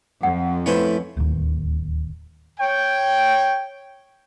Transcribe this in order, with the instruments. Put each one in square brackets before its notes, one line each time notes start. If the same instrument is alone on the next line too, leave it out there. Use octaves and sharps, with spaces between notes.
[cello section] F2 [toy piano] F#5
[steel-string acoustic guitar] A3 E4 [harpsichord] C#4 B4 C5
[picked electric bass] D1 D#2
[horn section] C#5 G5